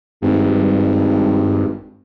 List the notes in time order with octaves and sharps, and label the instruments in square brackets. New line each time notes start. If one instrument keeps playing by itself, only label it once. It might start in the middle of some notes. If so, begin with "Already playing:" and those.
[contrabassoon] G#1 [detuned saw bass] G2